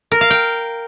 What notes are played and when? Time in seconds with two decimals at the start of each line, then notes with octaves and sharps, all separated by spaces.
0.12 A#4
0.21 F5
0.30 G5